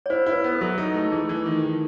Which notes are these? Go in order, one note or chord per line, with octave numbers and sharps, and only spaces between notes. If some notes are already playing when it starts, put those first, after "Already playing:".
C#5
E4 C5
E4
B4
B3
A4
F#3
D#4 A4
A3
E3 G#4
E3
D#3 A4
D#3